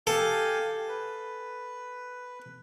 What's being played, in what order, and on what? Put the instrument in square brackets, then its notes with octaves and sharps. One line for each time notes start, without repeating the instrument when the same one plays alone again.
[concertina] G4 F5 G#5 [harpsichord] A4
[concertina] B4